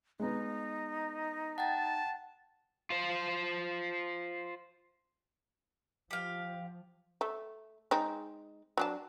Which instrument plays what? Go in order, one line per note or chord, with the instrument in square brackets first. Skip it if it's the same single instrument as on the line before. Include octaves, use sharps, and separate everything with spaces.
[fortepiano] G#3 B3 [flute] D#4
[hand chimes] F#5 G5 A6 [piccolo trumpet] A5
[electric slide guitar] F4 C5
[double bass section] F3 [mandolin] G4 F5
[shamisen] A3
G#3 C4 D#4
F#3 D4 A5